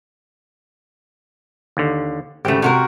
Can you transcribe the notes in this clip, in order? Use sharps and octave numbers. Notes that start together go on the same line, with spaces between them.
D#2 D3
G#1 C#3 A3 G4
C3 F#4 A#4